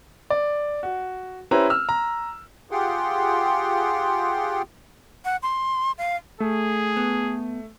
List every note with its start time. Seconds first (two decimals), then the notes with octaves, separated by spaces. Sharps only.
0.30 D5
0.83 F#4
1.51 C#4 E4 G4 B4 C5 A#5
1.70 E6 F6
1.89 A#5
2.71 F4 G4 G#4 F#5 G5 C6
5.25 F#5
5.43 C6
5.98 F5
6.40 A3 G#4
6.97 B3